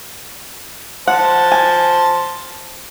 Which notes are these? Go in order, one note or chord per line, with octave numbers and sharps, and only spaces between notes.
C5 F#5 A5
G#5